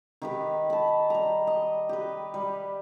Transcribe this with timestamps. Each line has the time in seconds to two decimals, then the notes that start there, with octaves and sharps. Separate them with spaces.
0.22 D#3 G4 B4
0.70 A5 B5
1.10 G3 A#5
1.47 D#5
1.89 G4 B4
2.34 G3